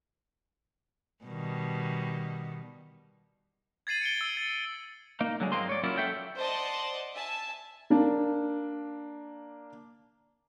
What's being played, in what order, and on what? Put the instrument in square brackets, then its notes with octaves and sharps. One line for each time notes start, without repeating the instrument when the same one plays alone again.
[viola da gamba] B2 D#3 G3
[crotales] G#6 A6 C7 D#7 F#7
C#7 D7 G7
E6
A6
[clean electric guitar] A#3 D#4
D3 F#3 G#3
G#2 G#3 A#3 C4 F4 C6
C#5 D5
F#3 A#3 C#4 E4 F4
A4 E5 F#5 G5
[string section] C5 D5 D#5 F#5 A5 C6
E5 G#5 A5
[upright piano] A#3 D4